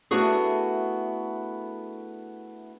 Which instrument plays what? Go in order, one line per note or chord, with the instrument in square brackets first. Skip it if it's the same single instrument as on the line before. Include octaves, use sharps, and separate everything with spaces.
[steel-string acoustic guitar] A3 B3 D4 E4 F#4 G#4